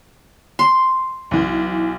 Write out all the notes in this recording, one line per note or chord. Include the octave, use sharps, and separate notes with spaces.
C6
B1 E3